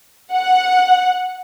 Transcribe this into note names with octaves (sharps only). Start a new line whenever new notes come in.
F#5